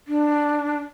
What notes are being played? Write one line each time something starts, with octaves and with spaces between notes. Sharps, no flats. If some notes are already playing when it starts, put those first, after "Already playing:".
D4